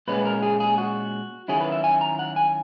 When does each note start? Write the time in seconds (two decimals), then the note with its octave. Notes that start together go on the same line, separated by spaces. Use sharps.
0.08 A#2 G#3 C#4 B4
0.25 A#4
0.42 G#4
0.60 G#4
0.78 F#4
1.48 D#3 F#3 C#4 E4 G#4
1.61 B4
1.72 E5
1.84 G#5
2.01 A#5
2.19 F#5
2.36 G#5